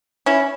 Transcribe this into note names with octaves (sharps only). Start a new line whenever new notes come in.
C#4 E4